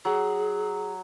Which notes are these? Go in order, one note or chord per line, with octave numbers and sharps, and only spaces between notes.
F#3 G#4